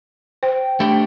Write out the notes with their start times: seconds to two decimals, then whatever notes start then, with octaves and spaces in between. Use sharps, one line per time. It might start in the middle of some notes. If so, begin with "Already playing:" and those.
0.43 C5 G5
0.80 A3 D4 G4